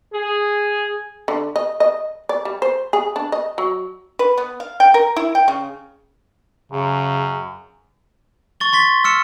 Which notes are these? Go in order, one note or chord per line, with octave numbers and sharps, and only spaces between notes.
G#4
D3
D#5
D#5
D5
G3
C5
G#4
D4
D#5
F#3
B4
B3
F5
G5
A#4
E4
G5
C#3
F#2 C#3
C#6 A6 G7
C6 A6 B6 G7
E6 F6 C#7 E7